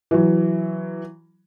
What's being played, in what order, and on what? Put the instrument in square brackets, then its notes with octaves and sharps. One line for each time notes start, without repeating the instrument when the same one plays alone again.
[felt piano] E3 F#3